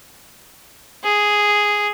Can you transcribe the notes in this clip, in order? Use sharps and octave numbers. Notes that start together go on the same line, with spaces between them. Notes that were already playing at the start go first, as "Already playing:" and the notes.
G#4